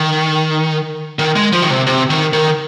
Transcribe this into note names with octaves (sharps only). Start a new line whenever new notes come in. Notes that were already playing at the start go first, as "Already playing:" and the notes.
Already playing: D#3
D#3
G#3
F3
D#3
C3
C3
D#3
D#3